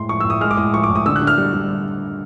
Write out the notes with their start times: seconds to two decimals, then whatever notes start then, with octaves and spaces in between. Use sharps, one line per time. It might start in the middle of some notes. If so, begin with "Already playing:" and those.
Already playing: A2 G#3 C6
0.09 F3 C#6
0.20 E6
0.25 A2
0.30 D#6
0.41 G#3 F6
0.51 D6
0.57 A2 D#6
0.73 F3 C#6
0.84 D6
0.89 A2
0.95 D#6
1.06 D3 E6
1.16 F#6
1.22 D3
1.27 F6
1.38 G3
1.53 G3